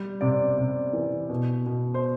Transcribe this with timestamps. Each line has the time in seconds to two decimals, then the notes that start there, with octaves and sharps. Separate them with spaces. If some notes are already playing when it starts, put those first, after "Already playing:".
Already playing: G3
0.21 C3 D5
0.58 C3
0.93 E3
1.29 B2
1.66 B2
1.94 C5